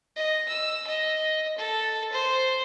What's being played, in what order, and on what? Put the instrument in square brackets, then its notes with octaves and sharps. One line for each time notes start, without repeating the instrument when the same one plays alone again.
[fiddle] D#5
E6
D#5
A4
C5